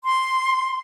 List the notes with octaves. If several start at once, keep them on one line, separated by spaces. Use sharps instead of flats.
C6